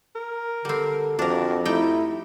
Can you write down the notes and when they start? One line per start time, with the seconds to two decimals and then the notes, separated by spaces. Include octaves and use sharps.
0.15 A#4
0.65 D3 G3 C4
1.19 F2 F3 D4 F#4 A#4
1.65 G3 A3 D#4 E4 G5